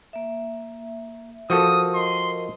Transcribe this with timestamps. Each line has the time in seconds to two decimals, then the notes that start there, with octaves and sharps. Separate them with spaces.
0.13 A#3 E5
1.50 F3 F#4 A4 A#4 D#6
1.94 A#4 D#5 C6